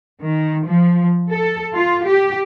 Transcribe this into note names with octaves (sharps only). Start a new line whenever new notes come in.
D#3
F3
A4
F4
G4